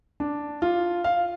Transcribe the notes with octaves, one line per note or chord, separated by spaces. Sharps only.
D4
F4
F5